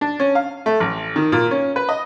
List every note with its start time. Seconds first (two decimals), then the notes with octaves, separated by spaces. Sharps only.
0.01 D4
0.20 C#4
0.35 F5
0.66 A3
0.80 A1
1.16 D#3
1.32 A#2
1.51 C#4
1.76 B4
1.89 D#5